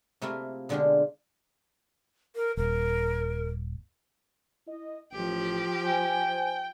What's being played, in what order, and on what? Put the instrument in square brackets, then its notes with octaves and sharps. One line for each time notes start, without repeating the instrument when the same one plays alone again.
[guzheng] C3 A3 A#3 E4 F4
B2 D3 G#3 D4 F4 G4
[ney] A#4
[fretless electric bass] D#1 [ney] A#4
[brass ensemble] E4 D#5
[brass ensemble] A1 [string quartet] F3 G4
[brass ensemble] C5 G#5 [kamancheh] G5